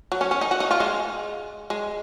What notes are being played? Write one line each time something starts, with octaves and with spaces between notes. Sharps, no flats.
F#3
C#4
C#4
D#4
F#4
D#4
F4
G#3
G#3